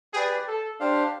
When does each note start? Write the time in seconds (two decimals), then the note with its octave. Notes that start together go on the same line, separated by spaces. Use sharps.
0.13 G4 G#4 B4 D5
0.47 A4
0.80 D4 G4 C5 F5